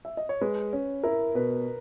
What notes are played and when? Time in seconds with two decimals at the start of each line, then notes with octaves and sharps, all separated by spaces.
0.05 E5
0.17 D#5
0.29 C#5
0.41 G#3 B4
0.73 C#4
1.04 E4 A#4
1.35 B2 B4